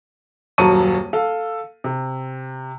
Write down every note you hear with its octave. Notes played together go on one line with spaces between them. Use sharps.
D#1 F#2 F#3 A5 C#6 D#7
A4 F5
C3